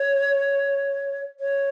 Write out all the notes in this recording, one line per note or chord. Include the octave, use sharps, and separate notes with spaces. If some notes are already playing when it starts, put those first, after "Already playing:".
Already playing: C#5
C#5